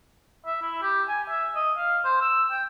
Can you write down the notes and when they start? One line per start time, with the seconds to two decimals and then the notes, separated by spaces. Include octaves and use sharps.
0.47 E5
0.62 E4
0.82 G4
1.08 G#5
1.30 E5
1.56 D#5
1.78 F5
2.05 C5
2.21 E6
2.51 G5